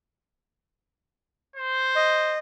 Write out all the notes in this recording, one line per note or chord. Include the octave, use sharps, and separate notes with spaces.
C5
D#5